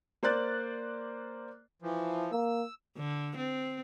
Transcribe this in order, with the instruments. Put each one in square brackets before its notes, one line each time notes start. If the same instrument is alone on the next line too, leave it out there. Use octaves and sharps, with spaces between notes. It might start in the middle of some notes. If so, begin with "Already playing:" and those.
[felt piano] A#3 C5 D5 F#6 A6
[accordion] E3 F3
[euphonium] A#3 [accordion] E6
[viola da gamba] D3
C4